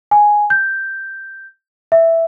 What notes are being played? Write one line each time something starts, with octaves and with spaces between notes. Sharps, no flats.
G#5
G6
E5